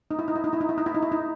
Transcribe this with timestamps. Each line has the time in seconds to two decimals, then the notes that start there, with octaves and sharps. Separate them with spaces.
0.11 D#4
0.19 E4
0.28 D#4
0.35 E4
0.44 D#4
0.53 E4
0.61 D#4
0.69 E4
0.78 D#4
0.86 E4
0.95 D#4
1.03 E4
1.12 D#4